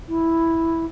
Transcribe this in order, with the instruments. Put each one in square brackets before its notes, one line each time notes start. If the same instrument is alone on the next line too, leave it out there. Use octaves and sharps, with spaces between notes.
[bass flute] E4